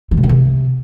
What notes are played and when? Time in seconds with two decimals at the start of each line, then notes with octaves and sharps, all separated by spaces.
0.11 E3
0.17 C3
0.23 D#3
0.29 C3